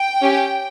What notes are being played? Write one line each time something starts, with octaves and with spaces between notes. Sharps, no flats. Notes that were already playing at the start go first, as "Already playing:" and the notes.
Already playing: G5
C#4 G4